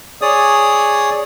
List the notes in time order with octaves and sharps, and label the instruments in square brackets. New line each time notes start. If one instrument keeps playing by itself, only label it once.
[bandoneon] G#4 C#5 D5 D#6